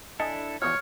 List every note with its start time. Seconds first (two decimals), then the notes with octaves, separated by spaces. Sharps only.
0.20 D4 E4 A4 D#5 G#5
0.62 E2 B2 F3 C#5 F6